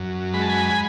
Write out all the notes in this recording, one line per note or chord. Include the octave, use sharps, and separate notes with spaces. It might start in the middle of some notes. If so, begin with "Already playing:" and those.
Already playing: F#2
G#3 B5
A5
G#5 B5